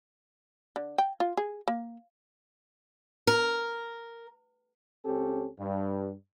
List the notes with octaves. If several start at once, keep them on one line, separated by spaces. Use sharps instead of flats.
D3
G5
F4
G#4
A#3
A#4
C#2 C4 C#4 G4 A4
G2